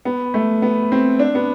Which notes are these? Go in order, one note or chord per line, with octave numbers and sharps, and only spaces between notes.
B3
A3
B3
C4
D4
B3